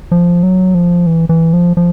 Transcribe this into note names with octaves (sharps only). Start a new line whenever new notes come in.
F3
F#3
F3
E3
E3
F3
F3